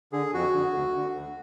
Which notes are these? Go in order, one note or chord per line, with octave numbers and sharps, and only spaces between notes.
D3 G#4
F2 F#4
D3
D2
D3
D2